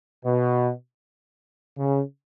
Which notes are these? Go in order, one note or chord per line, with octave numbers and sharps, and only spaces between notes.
B2
C#3